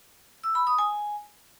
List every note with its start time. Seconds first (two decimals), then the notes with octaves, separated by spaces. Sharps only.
0.44 E6
0.55 B5
0.67 D#6
0.78 G#5